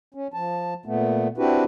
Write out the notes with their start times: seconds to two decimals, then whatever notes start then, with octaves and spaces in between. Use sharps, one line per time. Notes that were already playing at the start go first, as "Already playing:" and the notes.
0.14 C#4
0.34 F3 A5
0.86 A#2 A3 B3
1.38 C4 D4 E4 F#4 G4 B4